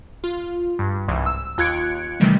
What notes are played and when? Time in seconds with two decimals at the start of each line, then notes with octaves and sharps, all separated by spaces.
0.24 F4
0.79 G2
1.08 C2 G#2 E3
1.26 E6
1.58 D#2 F4 F#6 G#6 C#7 D7
2.20 C3 D#3 E3 G3 A3